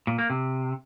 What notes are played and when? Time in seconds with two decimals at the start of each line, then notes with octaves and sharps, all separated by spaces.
0.07 A#2
0.18 A#3
0.30 C3